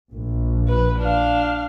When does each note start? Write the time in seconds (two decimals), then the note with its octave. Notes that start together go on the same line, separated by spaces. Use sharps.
0.10 A#1
0.68 B4
0.99 D4 F5